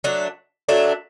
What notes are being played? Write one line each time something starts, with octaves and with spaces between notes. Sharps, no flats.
F#3 A3 D4
F#3 A3 D4